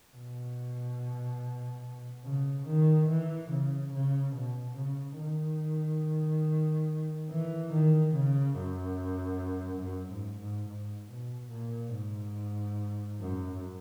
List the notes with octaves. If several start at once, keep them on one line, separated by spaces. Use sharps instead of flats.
B2
C#3
D#3
E3
C#3
C#3
B2
C#3
D#3
E3
D#3
C#3
F#2
F#2
G#2
G#2
G#2
B2
A#2
G#2
F#2